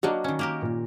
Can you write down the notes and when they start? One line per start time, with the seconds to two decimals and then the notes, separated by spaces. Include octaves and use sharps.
0.03 F#3 A#3 D4 F#4 D#5
0.24 D#3 C#4
0.39 A#3 G4 A#4
0.62 A#2